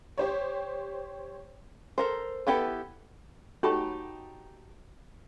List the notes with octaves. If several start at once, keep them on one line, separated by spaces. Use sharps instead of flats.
G4 C5 C#5
A4 A#4 C5
B3 E4 G4 A4 B4
A3 D#4 F#4 G4 C#5 A5 B5 C#6